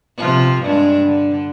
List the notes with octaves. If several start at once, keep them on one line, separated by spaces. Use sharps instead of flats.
C3 F3 F4
G2 G#3 D4
D3